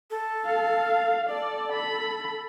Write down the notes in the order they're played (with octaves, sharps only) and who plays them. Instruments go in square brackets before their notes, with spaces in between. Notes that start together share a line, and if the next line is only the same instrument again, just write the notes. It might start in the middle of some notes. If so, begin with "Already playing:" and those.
[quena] A4
[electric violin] F5
[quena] A4 [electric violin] D5
[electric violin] B5